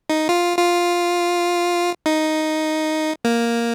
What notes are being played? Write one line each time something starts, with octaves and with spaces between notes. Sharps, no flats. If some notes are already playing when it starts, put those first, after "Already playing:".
D#4
F4
F4
D#4
A#3